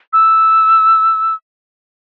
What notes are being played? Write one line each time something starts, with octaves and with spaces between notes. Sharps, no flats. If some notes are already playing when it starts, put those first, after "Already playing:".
E6